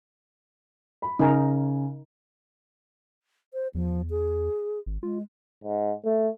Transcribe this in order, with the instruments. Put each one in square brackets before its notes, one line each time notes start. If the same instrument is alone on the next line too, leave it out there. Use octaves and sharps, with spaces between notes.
[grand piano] B5
[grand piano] C#3 G#5 [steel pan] D#4 A#4
[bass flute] C5
[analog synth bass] E2 [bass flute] F3
[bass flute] G#4
[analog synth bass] G#1
[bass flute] G#3 [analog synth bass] F4
[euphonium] G#2
A3